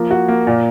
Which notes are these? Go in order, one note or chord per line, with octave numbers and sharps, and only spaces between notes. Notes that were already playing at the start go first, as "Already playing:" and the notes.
Already playing: F3 A#3
F#4
A#3
A#2